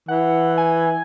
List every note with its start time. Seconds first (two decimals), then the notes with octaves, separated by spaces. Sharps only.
0.08 E3 F#5
0.58 G#5